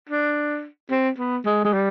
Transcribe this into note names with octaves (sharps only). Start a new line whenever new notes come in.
D4
C4
B3
G#3
G#3
G3